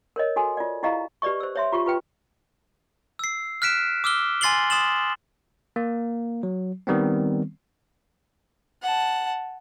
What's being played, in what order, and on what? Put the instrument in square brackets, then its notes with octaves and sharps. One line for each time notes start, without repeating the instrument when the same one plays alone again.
[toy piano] A#4 C#5 D#5
F#4 A4 G#5 C6
F4 D5
E4 F4 G4 D#5 F5 A#5
G4 B4 D5 D#5 C#6
C5 E6
C#5 E5 C6
F4 G4 C#6
F4 B4 G5
[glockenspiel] E6 C7
F6 F#6 B6 D7 E7
D6 E6 F6 G7
G#5 C6 A6 C7 F#7 G7
C6 D#6 A6 E7 F#7
[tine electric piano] A#3
F#3
D#3 G3 B3 C4
[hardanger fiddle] F#5 A5